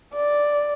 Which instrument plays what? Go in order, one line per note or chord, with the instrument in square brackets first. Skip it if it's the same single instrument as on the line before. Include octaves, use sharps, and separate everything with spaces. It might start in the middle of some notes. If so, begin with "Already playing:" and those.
[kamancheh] D5